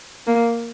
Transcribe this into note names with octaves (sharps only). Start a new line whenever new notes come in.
A#3